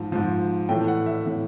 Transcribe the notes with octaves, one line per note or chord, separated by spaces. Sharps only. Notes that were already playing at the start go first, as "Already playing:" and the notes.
Already playing: G#2 F3
G#2 F3
A2 E3 G5
F#5
E5
A2 E3